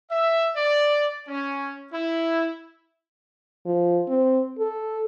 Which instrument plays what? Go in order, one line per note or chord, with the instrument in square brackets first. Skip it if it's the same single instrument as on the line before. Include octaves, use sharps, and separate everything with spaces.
[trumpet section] E5
D5
C#4
E4
[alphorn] F3
C4
A4